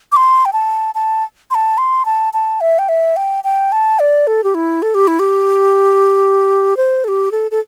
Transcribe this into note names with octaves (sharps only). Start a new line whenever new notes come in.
D6
C6
G5
A5
A5
C6
A5
C6
A5
A5
E5
G5
E5
G5
G5
A5
D5
A4
G4
E4
A4
G4
E4
G4
C5
A4
G4
A4
A4